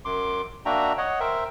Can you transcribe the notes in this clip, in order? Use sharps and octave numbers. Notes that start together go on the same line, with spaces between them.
F#2 C6 D6
A#3 D4 F#4 E5 G5 A#5
C#5 D#5 F#5
A#4 C5 E5 G5